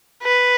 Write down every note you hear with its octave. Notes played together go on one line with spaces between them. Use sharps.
B4